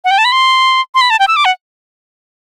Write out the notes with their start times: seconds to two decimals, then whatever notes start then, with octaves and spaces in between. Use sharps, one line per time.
0.05 F#5
0.11 G5
0.18 A5
0.25 B5
0.32 C6
0.95 C6
1.01 B5
1.10 A5
1.19 G5
1.28 E6
1.36 D6
1.45 F#5